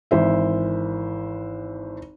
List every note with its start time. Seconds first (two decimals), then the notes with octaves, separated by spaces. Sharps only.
0.11 G#1 E3 C5 E5